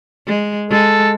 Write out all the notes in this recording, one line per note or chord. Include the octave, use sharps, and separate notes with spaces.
G#3
G#3 A4